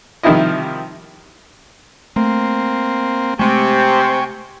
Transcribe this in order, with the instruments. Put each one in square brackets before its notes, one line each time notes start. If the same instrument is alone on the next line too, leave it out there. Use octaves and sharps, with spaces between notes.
[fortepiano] C3 D#3 F3 G3 E4 D#5
[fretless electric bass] A3 [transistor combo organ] A#3 C4
[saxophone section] C3 [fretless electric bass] G#3 A3 [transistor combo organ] G5 G#5 C#6